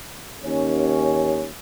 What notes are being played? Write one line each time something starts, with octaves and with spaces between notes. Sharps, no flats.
D#2 C#4